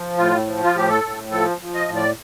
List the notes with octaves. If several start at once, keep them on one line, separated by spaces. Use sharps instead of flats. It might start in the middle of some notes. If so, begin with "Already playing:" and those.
Already playing: F3
A2 F4
F3
F4
A2 G4
A4
A2
F3 A4
F3
D#5
A2
D5